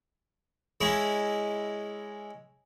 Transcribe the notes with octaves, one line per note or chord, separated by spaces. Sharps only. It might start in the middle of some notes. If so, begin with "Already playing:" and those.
G#3 C#4 E4 G#4